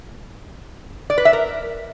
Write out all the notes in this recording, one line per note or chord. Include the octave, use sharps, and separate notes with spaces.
D5
B4
E5
A#4